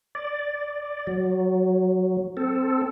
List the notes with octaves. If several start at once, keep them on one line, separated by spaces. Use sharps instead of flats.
D5
F#3
C4 A4